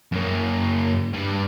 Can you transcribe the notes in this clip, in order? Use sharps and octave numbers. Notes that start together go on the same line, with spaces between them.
F#2 A#3
G2 G3